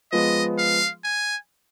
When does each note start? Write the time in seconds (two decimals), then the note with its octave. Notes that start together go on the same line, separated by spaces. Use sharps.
0.12 F3 G#3 B3 D#5
0.58 F5
1.04 G#5